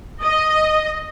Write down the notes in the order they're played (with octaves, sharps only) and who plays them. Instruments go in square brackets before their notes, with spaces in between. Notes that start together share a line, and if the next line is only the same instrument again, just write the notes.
[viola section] D#5